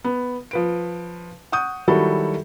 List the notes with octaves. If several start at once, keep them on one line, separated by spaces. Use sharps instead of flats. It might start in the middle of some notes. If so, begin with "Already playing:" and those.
B3
F3 B4 D7
F#5 C#6 D#6 G6
D#3 F#3 G3 E4 F#4 A4